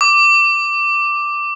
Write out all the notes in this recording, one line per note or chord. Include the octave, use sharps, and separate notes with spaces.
D6